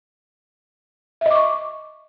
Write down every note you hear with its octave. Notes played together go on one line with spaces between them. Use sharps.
D#5 E5 C#6 D6